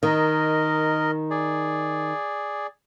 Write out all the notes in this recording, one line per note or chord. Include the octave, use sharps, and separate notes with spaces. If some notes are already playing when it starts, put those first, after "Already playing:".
D#3 A#4 D#5
G#4 D5